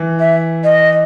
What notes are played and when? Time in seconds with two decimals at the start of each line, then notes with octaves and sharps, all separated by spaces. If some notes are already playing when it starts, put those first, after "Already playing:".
Already playing: E3
0.19 E5
0.64 D#5